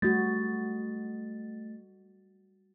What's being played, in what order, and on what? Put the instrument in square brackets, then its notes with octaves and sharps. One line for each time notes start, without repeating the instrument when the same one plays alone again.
[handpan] G3 F#4 [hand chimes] A3 A6